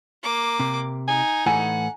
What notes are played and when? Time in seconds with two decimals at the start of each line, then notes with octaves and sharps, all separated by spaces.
0.23 A#3 D6
0.60 C3
1.08 D#4 G#5
1.46 A2 E3 F#5 G#5